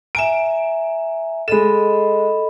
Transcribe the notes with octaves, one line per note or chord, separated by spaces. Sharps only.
E5 G#5 A#5 D7 E7
G#3 A4 D#5 B5 E7